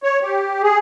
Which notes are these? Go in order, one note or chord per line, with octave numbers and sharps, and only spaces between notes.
C#5
G4
G#4